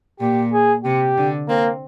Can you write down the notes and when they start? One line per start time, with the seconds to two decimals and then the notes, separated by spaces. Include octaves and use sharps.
0.20 A#2 G4
0.52 G#4
0.84 C3 G4
1.17 D3
1.48 A#3 C4